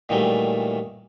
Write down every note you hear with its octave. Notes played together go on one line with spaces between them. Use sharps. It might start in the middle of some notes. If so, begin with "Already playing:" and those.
A#2 D#3 E3 F#3 G3 A3